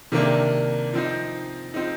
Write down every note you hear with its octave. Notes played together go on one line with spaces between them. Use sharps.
C3 D#3 A#3 D4
F3 C4 D#4
F3 C4 D#4